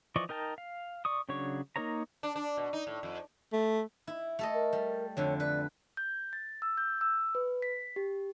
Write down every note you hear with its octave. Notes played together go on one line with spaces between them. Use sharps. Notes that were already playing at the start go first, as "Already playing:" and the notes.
E3 F3 D5 D#5 C#6
D#4 A#4 G5 A5
F5
D5 C#6 D#6
C#3 F#3 D4 C#5 C#6
A#3 D#4 A#4 C#5 A#5
D4
D4
B2
D#4
A2
F2
A3
E4
A3 A4 D#5
A#4
G3
F2 D3 C#5
B4 D5
G6
A6
E6
G6
E6
B4
B6
G4